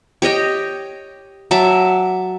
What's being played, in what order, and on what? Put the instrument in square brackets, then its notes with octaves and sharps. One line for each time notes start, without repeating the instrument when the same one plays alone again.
[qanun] G4 C#5 D#5 G5
F#3 E5 A5 D6